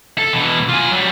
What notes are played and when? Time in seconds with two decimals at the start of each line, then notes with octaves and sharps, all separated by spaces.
0.18 A4
0.33 B2 E3
0.69 F4 G#5
0.91 F#3 G3